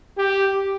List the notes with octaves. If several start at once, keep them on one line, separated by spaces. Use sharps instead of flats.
G4